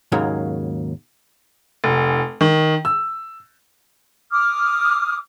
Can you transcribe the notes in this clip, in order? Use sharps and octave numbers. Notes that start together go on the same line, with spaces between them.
D#2 G#2 C#3 F#3 A#3
F1
D#3
E6
D6 D#6 F6